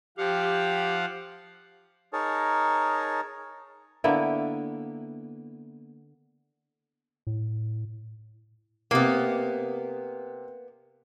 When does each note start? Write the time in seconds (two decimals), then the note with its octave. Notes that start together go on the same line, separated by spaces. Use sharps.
0.18 F3 G4 F5 F#5
2.13 D#4 G#4 A#4 C#5 A5
4.04 D3 A#3 B3 E4
7.27 A2
8.91 C3 A#3 B3